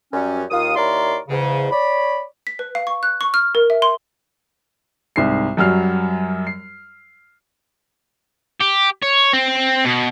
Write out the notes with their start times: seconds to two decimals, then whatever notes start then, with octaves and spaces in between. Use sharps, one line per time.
0.13 F#2 G3 C#4
0.51 D#2 F4 D#6
0.76 D#2 E4 A#4 C#5 D5 C6
1.29 E2 G#2 C#3
1.71 C#5 D5 B5
2.47 B6
2.59 B4
2.75 F5
2.87 C#6
3.03 F#6
3.21 C#6
3.34 F6
3.55 A#4
3.70 E5
3.82 C6
5.16 C2 G#2 C7
5.57 F#2 F#3 G3 F6 C7
6.47 C7
8.61 G4
9.02 C#5
9.33 C4
9.85 B2